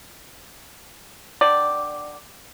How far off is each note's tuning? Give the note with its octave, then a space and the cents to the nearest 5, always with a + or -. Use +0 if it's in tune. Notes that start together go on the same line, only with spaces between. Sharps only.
D3 +25 D5 +0 G5 +0